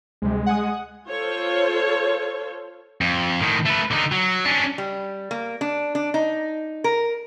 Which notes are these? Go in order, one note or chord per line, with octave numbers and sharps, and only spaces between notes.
D2 C3 G3 G#3
F#5 G#5 D#6
F4 A4 C5 C#5
F2
A2 D#3
A3 B4
D3 D#4
F#3
C#4 D4
G3
A#3
D4
D4
D#4
A#4